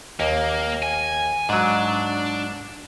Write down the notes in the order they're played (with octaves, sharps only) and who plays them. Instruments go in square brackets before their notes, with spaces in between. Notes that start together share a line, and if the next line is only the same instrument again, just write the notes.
[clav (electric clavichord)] D#2 [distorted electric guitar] A#3
[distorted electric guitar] G#5
[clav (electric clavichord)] G#2 F#3 [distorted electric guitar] D4